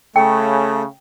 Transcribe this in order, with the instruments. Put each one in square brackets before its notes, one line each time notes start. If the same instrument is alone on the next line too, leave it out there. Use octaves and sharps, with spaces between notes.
[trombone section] C#3 [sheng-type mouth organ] A3 [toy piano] G5